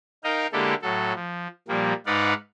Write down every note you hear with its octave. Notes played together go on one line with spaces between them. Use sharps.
D#4 A#4 D#5 F5 G5
D3 G#3 A#3 E4 G4 A4
A2 F#3 A4
F3
A#2 F3 G3 A#3
G#2 D#4 B4 D5 F5 F#5